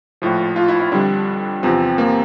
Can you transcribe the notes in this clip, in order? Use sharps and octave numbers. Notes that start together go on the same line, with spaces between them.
A#1 A2 F3
F4
E4
E4
F2 D3 G3 D4
E2 C3 F3 C4
A#3